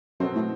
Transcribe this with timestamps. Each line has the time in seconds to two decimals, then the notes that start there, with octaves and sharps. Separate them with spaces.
0.20 F#2 B2 F#3 C4 F#4 A4
0.35 A2